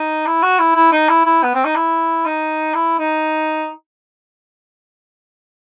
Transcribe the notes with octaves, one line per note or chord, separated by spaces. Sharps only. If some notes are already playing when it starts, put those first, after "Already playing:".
Already playing: D#4
E4
F#4
E4
E4
D#4
E4
E4
B3
C4
D#4
E4
D#4
E4
D#4